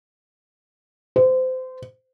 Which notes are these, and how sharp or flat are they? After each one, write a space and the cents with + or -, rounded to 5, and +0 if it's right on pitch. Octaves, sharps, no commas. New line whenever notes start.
C5 -25